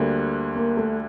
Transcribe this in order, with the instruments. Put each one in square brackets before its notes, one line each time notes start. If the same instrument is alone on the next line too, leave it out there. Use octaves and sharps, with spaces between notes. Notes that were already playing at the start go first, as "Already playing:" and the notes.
Already playing: [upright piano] D2 D3 G3 [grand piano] A#3
[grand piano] A#3
A3